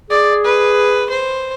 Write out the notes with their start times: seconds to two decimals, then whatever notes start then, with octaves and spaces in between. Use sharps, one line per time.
0.10 G#4 D5
0.45 B4
1.10 C5